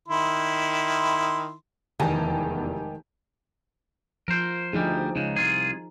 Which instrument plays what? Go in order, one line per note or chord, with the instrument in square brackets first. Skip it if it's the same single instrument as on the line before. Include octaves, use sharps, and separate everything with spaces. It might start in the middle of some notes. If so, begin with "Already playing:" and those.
[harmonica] D#3 E4 C6
[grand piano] F1 [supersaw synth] E2 [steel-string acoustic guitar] G#2 D#3 [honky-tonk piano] G4 G#5 A5
[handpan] F3 [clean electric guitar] A#4 C5
[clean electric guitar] D2 G3 [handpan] F3 D#4 G#4
[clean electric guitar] C#2 C#3 [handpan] D#4
[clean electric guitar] C2 F4 G#4